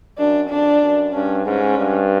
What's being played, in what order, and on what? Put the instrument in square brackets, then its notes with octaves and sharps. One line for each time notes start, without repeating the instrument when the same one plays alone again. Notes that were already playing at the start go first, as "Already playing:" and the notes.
[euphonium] F#2 [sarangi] D4
[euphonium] F2 [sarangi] D4
[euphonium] F#2
[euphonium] G2 [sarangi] C#4
[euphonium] G#2 [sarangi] C#4
[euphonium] G2